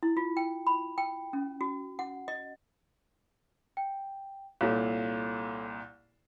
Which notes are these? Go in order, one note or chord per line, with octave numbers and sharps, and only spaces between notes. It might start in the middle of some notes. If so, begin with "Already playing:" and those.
E4
F4
G5
B5
G5
C#4
F#4
F#5
D#5
G5
C2 A#2 A4 C#5 F5